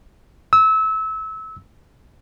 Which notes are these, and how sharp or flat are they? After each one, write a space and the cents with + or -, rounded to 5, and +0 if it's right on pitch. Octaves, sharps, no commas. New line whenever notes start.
E6 -25